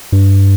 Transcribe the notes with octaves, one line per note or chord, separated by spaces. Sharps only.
G2